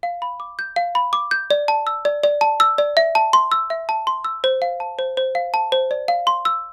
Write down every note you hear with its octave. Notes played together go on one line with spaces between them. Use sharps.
F5
B5
D6
G6
F5
B5
D6
G6
D5
A5
E6
D5
D5
A5
E6
D5
E5
A5
C6
E6
E5
A5
C6
E6
C5
F5
A5
C5
C5
F5
A5
C5
D5
F5
C6
E6